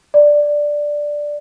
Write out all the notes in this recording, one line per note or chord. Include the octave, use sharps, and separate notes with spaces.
D5